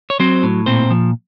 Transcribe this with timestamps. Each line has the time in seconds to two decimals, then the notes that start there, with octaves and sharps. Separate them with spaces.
0.10 C#5
0.20 F#3 C4 C5
0.43 A2
0.66 A#2 C4 C5
0.90 F3